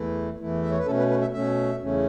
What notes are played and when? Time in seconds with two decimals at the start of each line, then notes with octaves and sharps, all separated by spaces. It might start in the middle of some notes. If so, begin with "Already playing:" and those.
Already playing: E2 E3 A3 E4
0.39 E2 E3 A3 E4
0.63 E5
0.71 C#5
0.79 B4
0.86 B2 A3 C#4 A4
0.98 B4
1.10 B4
1.21 E5
1.33 B2 A3 C#4 E5
1.80 E2 C#3 A3 C#4